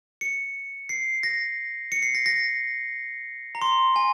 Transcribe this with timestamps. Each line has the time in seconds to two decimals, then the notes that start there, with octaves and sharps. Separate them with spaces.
0.21 C#7
0.89 C7
1.23 A#6
1.92 C#7
2.02 C7
2.15 A#6
2.26 A#6
3.55 A#5
3.62 C6
3.96 G#5